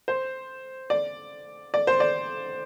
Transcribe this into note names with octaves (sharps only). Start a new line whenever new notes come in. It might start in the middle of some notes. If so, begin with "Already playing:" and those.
C5
D5
D5
C5
D5